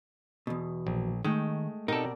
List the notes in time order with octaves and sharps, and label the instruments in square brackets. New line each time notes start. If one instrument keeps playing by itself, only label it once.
[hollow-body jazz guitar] E2 B2
[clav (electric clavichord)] A#1
[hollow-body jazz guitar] D#3 [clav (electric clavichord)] G#3 [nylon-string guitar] A3 G5
[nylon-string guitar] B2 C4 G4 [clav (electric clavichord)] D#4 A4 [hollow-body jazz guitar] A#4 D5